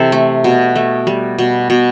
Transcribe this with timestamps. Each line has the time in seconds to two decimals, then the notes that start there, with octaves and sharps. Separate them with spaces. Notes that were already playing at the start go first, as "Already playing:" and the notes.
Already playing: C3 E3 A4
0.12 A3
0.44 B2
0.76 A3
1.07 G3
1.39 B2
1.70 B2